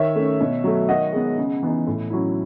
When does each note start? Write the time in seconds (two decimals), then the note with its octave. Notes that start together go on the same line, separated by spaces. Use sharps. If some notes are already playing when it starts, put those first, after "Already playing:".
Already playing: D#3 C#5 E5
0.16 A3 C#4
0.41 B2
0.64 F#3 A3
0.89 D#3 D#5 F#5
1.13 G#3 B3
1.37 C#3
1.63 E3 B3 D#4
1.87 A2
2.10 F#3 C#4 E4